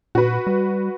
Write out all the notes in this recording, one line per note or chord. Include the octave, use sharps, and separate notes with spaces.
A#2 F#4 B4
G3